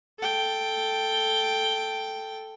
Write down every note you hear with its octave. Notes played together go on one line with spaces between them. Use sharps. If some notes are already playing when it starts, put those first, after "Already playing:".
A4 G5